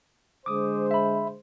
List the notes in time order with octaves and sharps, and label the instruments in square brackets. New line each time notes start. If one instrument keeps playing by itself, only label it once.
[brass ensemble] D3 G#3 C5 [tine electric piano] D6 D#6
[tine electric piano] E5 B5